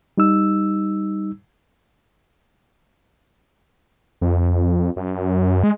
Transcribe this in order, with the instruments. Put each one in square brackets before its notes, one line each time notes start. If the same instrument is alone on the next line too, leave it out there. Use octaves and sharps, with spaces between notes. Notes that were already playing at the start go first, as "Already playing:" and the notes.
[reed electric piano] G3 D#4 E6
[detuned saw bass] F2
F#2
G#3